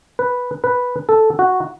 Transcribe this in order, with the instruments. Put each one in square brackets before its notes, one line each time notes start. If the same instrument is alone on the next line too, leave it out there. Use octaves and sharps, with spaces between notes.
[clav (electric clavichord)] B4
B4
A4
F#4